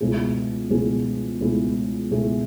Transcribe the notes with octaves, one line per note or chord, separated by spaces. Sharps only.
C#2 B2 A3 E4 G#4
C#2 B2 A3 E4 G#4
C#2 B2 A3 E4 G#4
C#2 B2 A3 E4 G#4